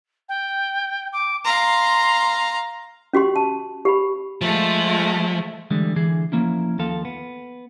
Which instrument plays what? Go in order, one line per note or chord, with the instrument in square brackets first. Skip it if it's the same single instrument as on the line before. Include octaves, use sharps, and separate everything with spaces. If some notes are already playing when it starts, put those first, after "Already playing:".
[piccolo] G5
D6
[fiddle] F5 A#5 [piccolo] C6
[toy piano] C#4 F#4 G4 C6
A5
G4 B5
[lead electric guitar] F3 [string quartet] G#3 A3
[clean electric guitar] D3 E3 G3 G#3
D3 E3 G#4
F3 A#3 C#4 E4
D#2 F3 A4 F5
B3